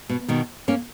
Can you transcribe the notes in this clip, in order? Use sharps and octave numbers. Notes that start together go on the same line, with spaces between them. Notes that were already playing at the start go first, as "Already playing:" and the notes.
B2
B2 D#3
A#3 C#4